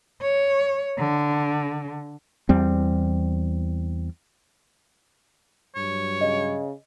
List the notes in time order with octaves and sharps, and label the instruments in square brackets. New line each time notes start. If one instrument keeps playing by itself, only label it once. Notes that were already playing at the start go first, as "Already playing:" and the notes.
[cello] C#5
D3
[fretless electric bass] E2 G3 C4
[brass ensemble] G2 F#3 [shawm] C#5
[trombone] C#3 [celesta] D#5